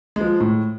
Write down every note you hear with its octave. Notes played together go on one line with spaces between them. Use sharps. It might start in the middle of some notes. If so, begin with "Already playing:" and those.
F3 G#3
A2